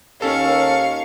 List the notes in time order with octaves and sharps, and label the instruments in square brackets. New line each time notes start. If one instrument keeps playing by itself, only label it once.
[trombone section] D#2 [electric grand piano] C#4 A4 [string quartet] F5 C#6